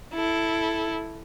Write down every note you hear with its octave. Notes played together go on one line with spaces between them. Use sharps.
E4 A4